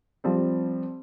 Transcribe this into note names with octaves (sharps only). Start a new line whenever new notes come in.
F3 G3 C4